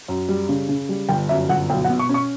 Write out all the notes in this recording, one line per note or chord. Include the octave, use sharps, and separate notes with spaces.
F#2
G3
C#3
C#3
G3
G1 G5
F#2 E5
G1 F#5
B1 G5
F#5
B2
C#6
C#4
C#6